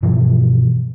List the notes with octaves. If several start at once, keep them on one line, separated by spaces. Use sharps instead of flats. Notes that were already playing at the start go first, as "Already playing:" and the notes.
G2 B2 E3 F3